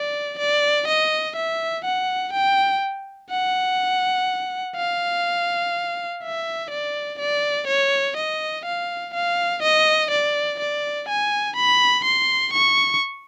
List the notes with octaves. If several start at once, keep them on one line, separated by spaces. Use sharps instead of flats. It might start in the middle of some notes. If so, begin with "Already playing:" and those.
Already playing: D5
D5
D#5
E5
F#5
G5
F#5
F5
E5
D5
D5
C#5
D#5
F5
F5
D#5
D5
D5
G#5
B5
C6
C#6